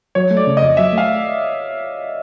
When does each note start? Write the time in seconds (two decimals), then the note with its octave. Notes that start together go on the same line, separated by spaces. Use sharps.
0.15 F#3 C#5
0.31 A3
0.37 D5
0.47 C#3
0.57 D#5
0.62 F2
0.77 F#3 E5
0.93 A3
0.98 F5